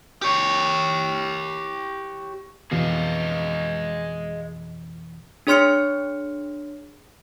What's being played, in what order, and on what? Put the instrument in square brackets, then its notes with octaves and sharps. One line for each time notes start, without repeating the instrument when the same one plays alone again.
[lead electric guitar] G4 C#5
[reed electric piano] F2 B2 E3 [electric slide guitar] G#4 D#5 F5
[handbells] D4 G#4 C#5 C6 F6 C#7